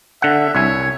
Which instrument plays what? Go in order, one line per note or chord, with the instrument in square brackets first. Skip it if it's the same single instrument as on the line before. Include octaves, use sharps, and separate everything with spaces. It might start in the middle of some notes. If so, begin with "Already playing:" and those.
[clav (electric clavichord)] D3 F#5 [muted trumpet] E5
[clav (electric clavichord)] C2 E5 G#5 [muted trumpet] C#5